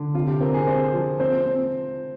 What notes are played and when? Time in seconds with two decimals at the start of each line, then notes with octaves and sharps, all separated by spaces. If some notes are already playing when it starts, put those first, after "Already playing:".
Already playing: D3
0.14 C3 F4
0.28 G4
0.41 C4 A#4
0.54 G#4
0.67 C3 C5
0.93 F3
1.20 C4 C5
1.46 C4